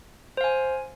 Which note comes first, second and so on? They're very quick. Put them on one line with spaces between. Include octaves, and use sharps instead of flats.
C5 F5 G#5